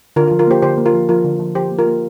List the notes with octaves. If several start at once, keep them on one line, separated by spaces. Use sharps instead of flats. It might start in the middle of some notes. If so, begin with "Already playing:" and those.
D3 F4 A#4
F4
F3
F4 A#4
A#3 G4 C5
D3 G4 C5
A#3
F4 A#4
F3
F3 F4 A#4
D3
F3
F3 G4 C5
A#3
F4 A#4
A#3